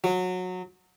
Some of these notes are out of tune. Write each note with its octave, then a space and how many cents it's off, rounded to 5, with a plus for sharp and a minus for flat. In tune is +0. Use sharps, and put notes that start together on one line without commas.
F#3 -20